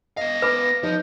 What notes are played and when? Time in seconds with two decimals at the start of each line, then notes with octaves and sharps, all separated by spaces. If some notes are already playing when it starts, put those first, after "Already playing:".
0.17 B3 D#5 F5 A#6
0.42 B4 B5 D6
0.83 F3 D#4 G6